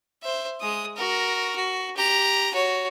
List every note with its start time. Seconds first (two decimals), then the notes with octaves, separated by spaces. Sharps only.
0.23 C5 E5
0.61 G#3 D#6
0.96 F#4 A#4
1.55 F#4
1.97 G4 A#5
2.53 F#4 C#5